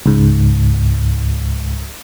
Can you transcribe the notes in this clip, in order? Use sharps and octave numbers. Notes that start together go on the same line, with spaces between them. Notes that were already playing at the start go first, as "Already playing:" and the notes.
C#2 G#2